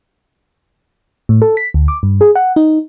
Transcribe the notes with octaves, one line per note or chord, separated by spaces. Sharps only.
A2
A4
B6
D2
D6
G2
G#4
F#5
D#4